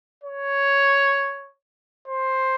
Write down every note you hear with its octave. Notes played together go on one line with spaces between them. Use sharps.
C#5
C5